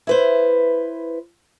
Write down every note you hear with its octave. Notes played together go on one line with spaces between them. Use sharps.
E4 B4 C5